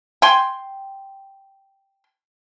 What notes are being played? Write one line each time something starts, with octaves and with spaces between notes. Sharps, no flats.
G5 G#5 C6